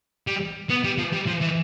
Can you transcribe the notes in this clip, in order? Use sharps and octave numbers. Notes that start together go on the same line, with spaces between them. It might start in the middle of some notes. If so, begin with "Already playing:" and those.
G3
B3
G3
F3
G3
F3
E3